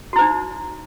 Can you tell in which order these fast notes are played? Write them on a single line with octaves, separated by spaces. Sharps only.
F#4 E4 C5 D#4